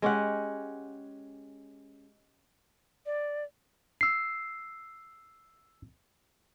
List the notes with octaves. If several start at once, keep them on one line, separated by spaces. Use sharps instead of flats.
G#3 C#4 G4 F#5
D5
E6 C7